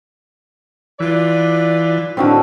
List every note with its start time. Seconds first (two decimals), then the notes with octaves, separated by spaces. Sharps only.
1.00 E3 F4 B4 D5
2.17 A2 D3 D#3 C4 F#4 A4